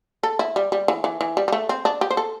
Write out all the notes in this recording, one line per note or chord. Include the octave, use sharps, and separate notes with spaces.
A4
E4
G3
G3
E3
E3
E3
G3
G3
A3
C4
D4
G4
C5
A4